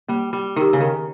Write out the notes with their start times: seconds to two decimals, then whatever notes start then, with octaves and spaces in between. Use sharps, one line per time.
0.09 G3 A#3
0.33 G3
0.56 D#3 D#4 G4
0.73 C#3
0.80 D#3